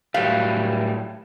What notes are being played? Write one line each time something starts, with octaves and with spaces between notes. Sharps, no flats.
A2 F#3 G3 F5